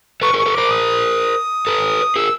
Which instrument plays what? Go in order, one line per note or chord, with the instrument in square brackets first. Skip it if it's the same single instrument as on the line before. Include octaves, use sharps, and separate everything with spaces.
[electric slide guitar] A4 B4 [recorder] C#6
[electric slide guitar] G#4 A#4
[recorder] C#6
[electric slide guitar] A4 B4
[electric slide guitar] A#4 C5 [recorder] D6
[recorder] D#6
[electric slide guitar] A4 B4
[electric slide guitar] G#4 A#4 [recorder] E6